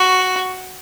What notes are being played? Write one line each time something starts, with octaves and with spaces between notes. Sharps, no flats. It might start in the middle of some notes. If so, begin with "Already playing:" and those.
Already playing: F#4